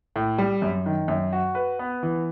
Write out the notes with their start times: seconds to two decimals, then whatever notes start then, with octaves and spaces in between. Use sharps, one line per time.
0.16 A2
0.38 G3
0.62 F#2
0.86 D#3
1.08 F#2
1.33 F#4
1.55 B4
1.79 B3
2.03 E3